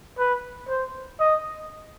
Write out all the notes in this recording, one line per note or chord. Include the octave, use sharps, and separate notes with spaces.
B4
C5
D#5